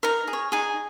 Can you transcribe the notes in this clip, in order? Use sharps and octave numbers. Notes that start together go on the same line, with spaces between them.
D#4 A#4 A#5
G#4
C#5
D#4 G#4 G#5